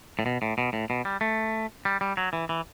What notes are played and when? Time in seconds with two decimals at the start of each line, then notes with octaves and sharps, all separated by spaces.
0.19 A2
0.26 B2
0.42 A2
0.58 B2
0.73 A2
0.90 B2
1.05 G3
1.21 A3
1.85 G3
2.01 G3
2.17 F#3
2.33 E3
2.49 E3